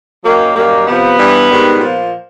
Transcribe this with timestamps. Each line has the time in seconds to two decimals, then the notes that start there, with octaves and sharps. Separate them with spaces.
0.24 F#2 D#3 F#3 A#3
0.55 F#2 D#3 G3 A#3
0.87 C3 F3 B3
1.18 G2 E3 G3
1.49 G#2 D#3 G3
1.80 A#2 F3